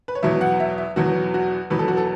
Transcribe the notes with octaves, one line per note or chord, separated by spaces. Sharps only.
B4
C#5
E2 B2 F#3 E5
F#5
E5
E5
E2 B2 F#3 F#4
F#4
E2 B2 F#3 B4
A4
F#4
A4